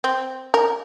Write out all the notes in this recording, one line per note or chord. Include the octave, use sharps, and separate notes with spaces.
C4
A#4